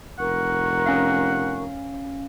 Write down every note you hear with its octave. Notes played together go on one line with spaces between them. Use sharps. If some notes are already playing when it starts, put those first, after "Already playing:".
F1 A#4 F#5 C#6
C#4 F5